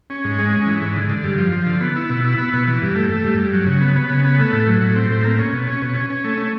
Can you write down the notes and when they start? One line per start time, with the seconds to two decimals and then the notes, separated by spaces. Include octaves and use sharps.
0.10 C#4
0.24 G#2
0.39 G#3
0.53 C#4
0.67 E3
0.82 G#2
0.96 D3
1.10 D3
1.24 G2
1.38 F3
1.52 F3
1.66 D3
1.81 B3
1.96 E4
2.10 B2
2.24 E4
2.38 B3
2.53 B2
2.67 E3
2.82 G2
2.96 A3
3.10 A3
3.24 G2
3.38 G2
3.53 F#3
3.66 C#3
3.81 B3
3.96 B3
4.10 C#3
4.24 B3
4.39 A3
4.53 A2
4.68 F#3
4.82 A2
4.95 C4
5.10 A2
5.24 A#3
5.39 C#4
5.53 B2
5.67 C#4
5.82 B2
5.95 C#4
6.10 C#4
6.24 A3
6.38 C#4